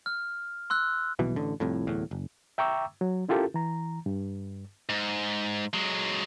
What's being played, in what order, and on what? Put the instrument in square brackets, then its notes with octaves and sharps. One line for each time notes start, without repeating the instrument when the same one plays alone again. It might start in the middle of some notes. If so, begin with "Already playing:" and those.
[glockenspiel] F6
C6 E6 F#6
[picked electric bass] D#1 B1 B2 E3
A1 D3
C2 F2 A2
D1 E2 A2
F#1
[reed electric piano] E5 G5 A#5 C#6 D6 E6
F#3
C#4 E4 F4 G4 A4 A#4
E3 A#5
G2
[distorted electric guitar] G#2
F#3 G#3